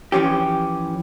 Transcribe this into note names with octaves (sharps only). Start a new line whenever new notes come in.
E3 F3 C#4 G4